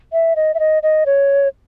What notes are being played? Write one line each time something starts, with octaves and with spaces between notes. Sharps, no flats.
E5
D#5
E5
D#5
D#5
C#5